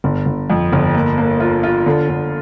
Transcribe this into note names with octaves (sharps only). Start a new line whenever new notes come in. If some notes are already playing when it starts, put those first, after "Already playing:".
G1
G1
F2
G1
A#3
A#3
F4
F4
D3
D3